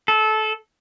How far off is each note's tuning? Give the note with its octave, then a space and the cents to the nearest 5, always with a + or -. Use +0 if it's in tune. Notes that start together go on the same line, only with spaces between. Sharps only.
A4 -20